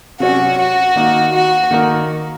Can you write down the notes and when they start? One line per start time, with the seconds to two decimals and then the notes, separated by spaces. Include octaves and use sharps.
0.20 C3 F#3 C#4 F#4
0.58 F#4
0.95 D#3 A#3 D#4
1.32 F#4
1.71 D#3 A#3 D#4 A#4